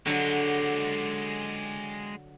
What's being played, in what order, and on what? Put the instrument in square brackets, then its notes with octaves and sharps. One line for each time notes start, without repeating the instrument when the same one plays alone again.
[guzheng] D3 F#3 [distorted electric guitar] G#3 G4